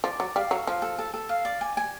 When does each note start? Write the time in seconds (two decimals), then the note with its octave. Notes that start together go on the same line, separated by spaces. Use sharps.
0.04 F3 D5
0.20 F#3 D5
0.36 G3 F5
0.51 F#3 A4
0.67 F3 F5
0.82 A4
0.99 A4
1.14 A4
1.29 F5
1.45 D5
1.61 G#5
1.77 G#5